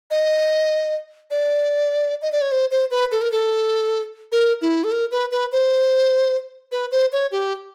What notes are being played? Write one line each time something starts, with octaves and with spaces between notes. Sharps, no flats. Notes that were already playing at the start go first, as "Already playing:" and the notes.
D#5
D5
D#5
D5
C#5
C5
C5
B4
A4
A#4
A4
A#4
E4
A4
A#4
B4
B4
C5
B4
C5
C#5
G4